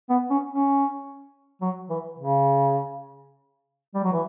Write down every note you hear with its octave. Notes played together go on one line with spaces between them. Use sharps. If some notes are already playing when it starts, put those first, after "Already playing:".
B3
C#4
C#4
F#3
E3
C#3
G3
F#3
E3